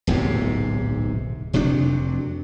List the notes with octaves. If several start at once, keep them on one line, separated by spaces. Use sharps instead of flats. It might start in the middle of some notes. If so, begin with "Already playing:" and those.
D1 B1 G#2 C3
F1 C3 F#3 D4